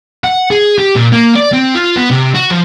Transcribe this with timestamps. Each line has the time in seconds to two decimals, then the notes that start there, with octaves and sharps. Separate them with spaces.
0.24 F#5
0.51 G#4
0.78 G4
0.95 A#2
1.12 A#3
1.36 D5
1.53 C4
1.75 F4
1.96 B3
2.11 C3
2.35 F#4
2.51 F3